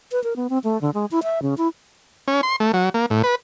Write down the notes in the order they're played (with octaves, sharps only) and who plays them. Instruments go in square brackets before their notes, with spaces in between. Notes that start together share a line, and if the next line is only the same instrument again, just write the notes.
[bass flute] B4
A#4
B3
C4
A3
D3
G#3
E4
E5
C#3
E4
[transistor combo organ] C#4
C6
A3
F#3
A#3
A2
B4